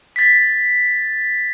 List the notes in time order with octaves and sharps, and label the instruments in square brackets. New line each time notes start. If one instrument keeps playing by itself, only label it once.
[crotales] A6 B6